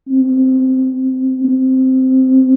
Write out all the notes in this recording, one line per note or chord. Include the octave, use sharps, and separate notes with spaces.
C4
C4